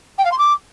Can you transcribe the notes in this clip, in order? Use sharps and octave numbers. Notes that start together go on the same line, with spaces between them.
G5
F5
C6
D6